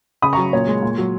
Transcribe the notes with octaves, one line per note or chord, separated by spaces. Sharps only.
C#3 B5 D#6
F#3 A#5 C#6
A#2 C#5
G#3
A#2
F#3